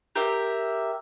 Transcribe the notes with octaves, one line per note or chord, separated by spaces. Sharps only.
G4 A#4 E5